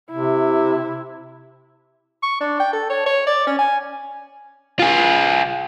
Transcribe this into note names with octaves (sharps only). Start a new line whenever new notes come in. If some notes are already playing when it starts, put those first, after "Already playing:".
C3 E4
C#6
D4
G5
A4
C#5
C#5
D5
C#4
G#5
F4 G#4